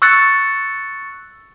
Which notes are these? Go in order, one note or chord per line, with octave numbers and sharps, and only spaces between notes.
C#6 E6 F#6 A6 C#7